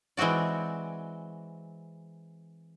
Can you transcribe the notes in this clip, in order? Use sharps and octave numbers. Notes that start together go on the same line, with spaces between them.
E3 G#3 C4 F#4 D5